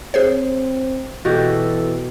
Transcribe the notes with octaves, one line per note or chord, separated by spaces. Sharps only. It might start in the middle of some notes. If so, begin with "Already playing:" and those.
C4 G#4 C5 C#5
B2 E3 F#4 G4 A4